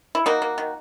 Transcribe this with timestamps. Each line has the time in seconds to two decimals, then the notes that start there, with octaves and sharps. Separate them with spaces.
0.15 E4
0.26 A#3 D#4 F#4
0.42 A#3
0.58 D#3